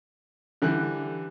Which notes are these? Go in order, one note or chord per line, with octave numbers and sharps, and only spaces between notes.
D3 E3 G3 G4 F#6